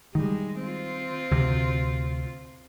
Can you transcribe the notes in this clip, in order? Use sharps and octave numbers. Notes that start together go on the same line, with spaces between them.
D#3 G3 G#3
C4 F4
D2 C3